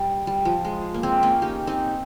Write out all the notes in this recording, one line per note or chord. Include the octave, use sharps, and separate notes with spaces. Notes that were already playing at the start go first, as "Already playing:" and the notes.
Already playing: G3
G3
F3
G#3
A#3
G#3 C4
A#3 C#4
D#4 G4
C4 D#4